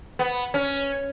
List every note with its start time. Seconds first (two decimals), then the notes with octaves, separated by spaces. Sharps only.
0.19 B3
0.54 C#4